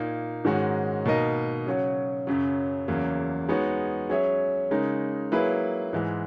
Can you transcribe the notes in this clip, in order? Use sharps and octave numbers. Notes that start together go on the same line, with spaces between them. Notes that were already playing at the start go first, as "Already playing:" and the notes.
Already playing: A#2 A#3 D#4
G#2 D#3 G#3 C#4 F#4
B2 A#3 D#4 A#4 D#5
C#3 F#3 C#4 F#4
F#2 C#3 F#3
E2 C#3 F#3 A#3
G#3 B3 D#4 F#4 C#5
F#3 C#4 G#4 C#5 E5
C#3 G#3 D#4 A#4
F#3 A#3 E4 G#4 B4
G#2 E3 G#3